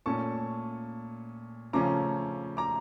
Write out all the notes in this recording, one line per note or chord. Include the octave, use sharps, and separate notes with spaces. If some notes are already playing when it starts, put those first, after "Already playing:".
A#2 A3 C#4 A5 C#6
C#3 F3 A3 C#4 A#5 D6
A#5 D6